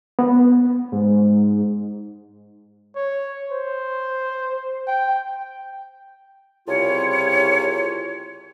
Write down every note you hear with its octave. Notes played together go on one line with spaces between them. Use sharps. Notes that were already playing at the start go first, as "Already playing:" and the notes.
B3
G#2
C#5
C5
G5
C2 C#3 E4 F4 C#5